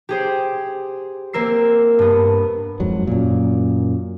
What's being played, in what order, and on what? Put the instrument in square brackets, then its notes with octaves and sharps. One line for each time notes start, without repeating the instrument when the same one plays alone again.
[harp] G4 G#4 C5
A#3 C4 A#4 E6 C7
G2 B3
[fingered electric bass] F2 G#2 F#3
F#2 A#2